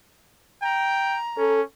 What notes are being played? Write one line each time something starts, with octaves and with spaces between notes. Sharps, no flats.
G5 A#5
C#4 A4